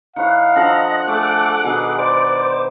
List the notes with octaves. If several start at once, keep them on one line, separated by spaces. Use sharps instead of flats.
D#3 E4 C#5 F5 F#5
F3 D4 A4 D#5 F#5 A#5 F#6
A3 G#4 A4 D5 D6
B2 D#3 G#4
C5 D5 D6